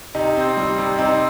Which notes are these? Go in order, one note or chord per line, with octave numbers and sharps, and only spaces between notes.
C3 D#4
C4
G3
C3
C4 D#4